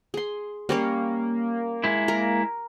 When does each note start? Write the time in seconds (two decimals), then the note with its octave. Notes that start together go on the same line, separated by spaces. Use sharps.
0.14 G#4 C6
0.69 G3 A#3 C#4 C#5
1.84 G#3 E4
2.08 A#4 A#5